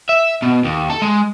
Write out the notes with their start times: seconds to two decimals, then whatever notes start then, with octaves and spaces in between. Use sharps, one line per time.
0.09 E5
0.43 B2
0.65 D#2
0.90 A4
1.02 G#3